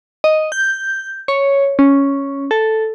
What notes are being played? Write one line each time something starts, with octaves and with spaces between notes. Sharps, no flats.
D#5
G6
C#5
C#4
A4